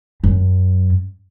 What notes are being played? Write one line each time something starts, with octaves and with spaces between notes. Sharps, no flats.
F#2